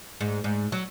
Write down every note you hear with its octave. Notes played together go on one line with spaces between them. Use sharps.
G#2
G#2
F#3